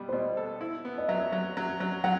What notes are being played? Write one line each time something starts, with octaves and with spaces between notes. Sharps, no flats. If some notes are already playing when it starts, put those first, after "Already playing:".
Already playing: B2 G3
C5
B2 D#5
A4
E4
B3
D#5
F#3 E5
F#3
F#3
F#3
F#3 F#5